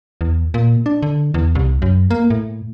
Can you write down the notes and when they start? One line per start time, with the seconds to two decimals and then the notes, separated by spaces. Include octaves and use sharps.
0.21 E2
0.54 A#2
0.86 D4
1.02 D3
1.34 E2
1.55 C2
1.82 F#2
2.11 A#3
2.30 A2